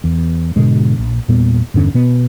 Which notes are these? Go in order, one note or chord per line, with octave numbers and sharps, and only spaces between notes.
E2
G#2 B2 D3 G#3
A#1
E2 A#2 G3 B3
E2 G2 D3 C#4
B2 B3